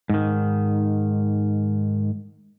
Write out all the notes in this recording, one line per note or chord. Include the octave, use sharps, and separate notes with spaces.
G#2 D#3